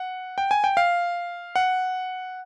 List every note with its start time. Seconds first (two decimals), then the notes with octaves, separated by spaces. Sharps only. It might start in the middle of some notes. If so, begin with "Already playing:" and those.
Already playing: F#5
0.38 G5
0.51 G#5
0.64 G5
0.77 F5
1.56 F#5